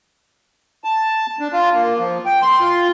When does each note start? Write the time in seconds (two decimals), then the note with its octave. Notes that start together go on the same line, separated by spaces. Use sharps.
0.84 A5
1.40 D4
1.52 F4
1.74 A#3
1.99 F3
2.26 G5
2.42 C6
2.60 F4